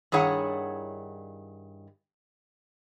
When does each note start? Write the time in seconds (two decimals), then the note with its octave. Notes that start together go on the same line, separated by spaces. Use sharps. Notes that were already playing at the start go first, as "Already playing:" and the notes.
0.12 G2 D#3 E4 G#4 C#5 F#5